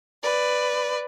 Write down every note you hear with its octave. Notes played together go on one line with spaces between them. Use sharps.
B4 D5